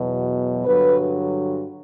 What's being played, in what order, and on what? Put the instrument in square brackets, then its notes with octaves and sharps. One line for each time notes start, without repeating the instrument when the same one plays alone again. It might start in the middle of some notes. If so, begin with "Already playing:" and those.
Already playing: [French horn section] E2 B2 F#3
G2 D3 F#3 B4